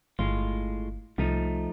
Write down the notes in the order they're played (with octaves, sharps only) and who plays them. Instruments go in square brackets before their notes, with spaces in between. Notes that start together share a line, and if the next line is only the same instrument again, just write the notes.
[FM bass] G1 [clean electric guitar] A2 G#3 F4
[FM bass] C2 [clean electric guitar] F3 A3 D#4